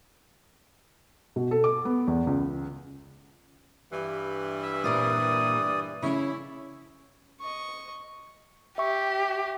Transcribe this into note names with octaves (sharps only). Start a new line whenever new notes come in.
B2
A4
D6
B3
E2
C#2
G2 E3
E5
A#2 A#4 C5 D5 D#6
C#3 C#4 E4 C#5
D#5 C#6
G4 E5 C#6